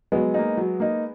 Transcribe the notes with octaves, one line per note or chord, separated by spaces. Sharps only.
F#3 G#3 B3
A#3 D#4
F#3
A#3 D#4